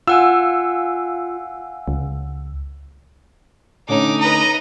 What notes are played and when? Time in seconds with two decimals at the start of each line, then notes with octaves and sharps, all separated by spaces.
0.07 F4 F5 F#5 G#5 E6
1.88 C#2
3.89 D3 A3 C#4 D#4 D6
4.20 B4 D#5 A#5